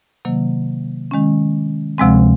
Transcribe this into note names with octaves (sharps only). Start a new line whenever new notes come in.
C3 D#3 F#3 A#3
D#3 G#3 C#4
D2 C3 F3 G#3 C4